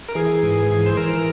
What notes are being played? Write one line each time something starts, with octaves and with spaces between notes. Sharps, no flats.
A#4
E3 G#4
G#2
E3
C5
E3 A#4